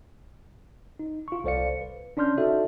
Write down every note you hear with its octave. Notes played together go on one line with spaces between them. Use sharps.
D#4
F4 C#6
C2 A4 C5 D5 F5 C#7
B4
C#4 D4 D5 C6 F6 G6
D#4 F#4 A4 D5 E5